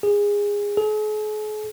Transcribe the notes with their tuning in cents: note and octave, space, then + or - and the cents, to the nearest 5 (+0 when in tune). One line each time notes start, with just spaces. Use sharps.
G#4 -20
G#4 +45